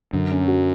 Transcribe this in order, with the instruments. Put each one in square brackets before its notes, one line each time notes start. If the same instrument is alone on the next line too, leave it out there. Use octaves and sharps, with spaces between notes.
[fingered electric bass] F#2 [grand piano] D3
[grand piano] C#4
F#3